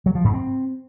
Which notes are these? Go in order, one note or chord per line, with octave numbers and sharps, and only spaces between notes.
F#3
F3
G#2
C4